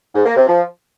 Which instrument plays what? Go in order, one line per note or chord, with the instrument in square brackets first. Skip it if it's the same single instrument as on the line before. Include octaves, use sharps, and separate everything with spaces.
[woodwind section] G#2
A#3
C3
F3